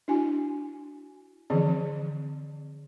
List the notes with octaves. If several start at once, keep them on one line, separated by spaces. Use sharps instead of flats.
D4 E4 F#4 G#5
D3 E3 F3 C4 G#4